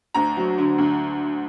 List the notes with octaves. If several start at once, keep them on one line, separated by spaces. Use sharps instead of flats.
D2 A#5
F#3
D3
D2